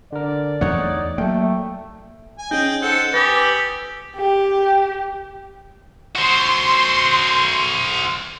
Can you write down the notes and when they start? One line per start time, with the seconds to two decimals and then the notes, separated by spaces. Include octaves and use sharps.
0.12 D3 A#4 D5
0.61 E2 A3 D#4 C#5 F#5
1.18 F#3 A3 A#3 G5
2.39 G#5
2.51 C#4 D#4 G#4 D#5 G5 G6
2.82 A4 C5 F#5 G6 C#7
3.14 G4 B4 G#5 D#6 A6
3.35 E6
4.15 G4
6.16 F#4 C5 C6